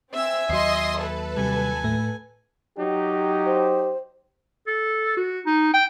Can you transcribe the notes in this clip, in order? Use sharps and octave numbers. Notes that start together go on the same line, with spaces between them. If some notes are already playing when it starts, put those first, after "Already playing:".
C4 E5 G#5 E6
D#2 F#3 D#5 C6 C7
A4 B4
C3 G3 G#5
A2 A3
F#3 D#4 G4
C5
A4
F#4
D#4
G5